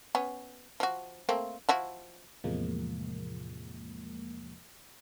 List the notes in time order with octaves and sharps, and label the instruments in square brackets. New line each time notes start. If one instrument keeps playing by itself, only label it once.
[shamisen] B3 C#4
F3 F#4
A3 A#3 C4
F3 E4 F#4
[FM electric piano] E2 A2 C3 F3 G#3 A#3